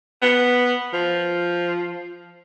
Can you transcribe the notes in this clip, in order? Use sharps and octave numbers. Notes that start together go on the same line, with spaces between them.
B3
F3